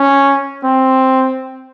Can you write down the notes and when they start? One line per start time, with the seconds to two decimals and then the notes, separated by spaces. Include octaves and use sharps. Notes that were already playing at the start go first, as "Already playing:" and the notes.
Already playing: C#4
0.64 C4